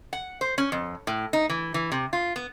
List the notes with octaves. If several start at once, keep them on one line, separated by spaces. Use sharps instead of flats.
F#5
C5
C#4
F2
A2
D#4
E3
E3
C3
F4
B3